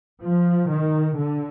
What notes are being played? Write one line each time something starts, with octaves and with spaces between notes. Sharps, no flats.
F3
D#3
D3